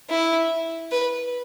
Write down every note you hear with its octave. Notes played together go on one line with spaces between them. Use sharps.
E4
B4